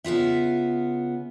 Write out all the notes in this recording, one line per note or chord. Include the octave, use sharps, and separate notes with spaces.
C#3 B3 F4 E5